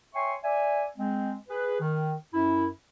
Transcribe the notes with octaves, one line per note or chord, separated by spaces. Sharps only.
C#5 E5 G5 G#5 C6 C#6
D5 E5 G#5
G#3 C4
G#4 B4
D#3
F#2 E4